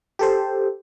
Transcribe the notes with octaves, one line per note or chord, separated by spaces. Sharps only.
G4 A4 C5